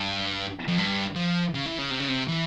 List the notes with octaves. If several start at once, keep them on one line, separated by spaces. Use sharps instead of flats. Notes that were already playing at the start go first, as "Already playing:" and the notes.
Already playing: G2
F2
G2
F3
C#3
E3
C#3
C3
C#3
C3
E3